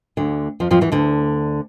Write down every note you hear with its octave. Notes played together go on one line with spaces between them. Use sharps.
D2 D3
F2 F3
F2 F3
E2 E3
D2 D3